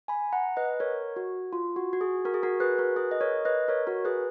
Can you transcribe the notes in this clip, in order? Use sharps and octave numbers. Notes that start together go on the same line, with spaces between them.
G#5 B5
F#5 A#5
B4 D#5
A#4 C#5
F#4
F4
F#4
F#4
G#4
F#4 A#4
G#4
F#4 A#4
G#4 B4
F#4 A#4
G#4 B4
D#5
A#4 C#5
B4 D#5
A#4 C#5
F#4 A#4
G#4 B4